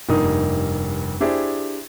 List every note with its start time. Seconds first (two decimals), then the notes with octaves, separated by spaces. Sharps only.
0.09 F1 G2 A#3 D#4 A#4 D#6
1.21 D4 E4 G4 G#4 C5 D5